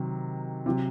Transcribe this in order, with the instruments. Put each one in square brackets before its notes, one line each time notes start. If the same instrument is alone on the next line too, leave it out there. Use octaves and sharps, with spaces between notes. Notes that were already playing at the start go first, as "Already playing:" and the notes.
Already playing: [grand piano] C3 D#3 F#3
C3 F#3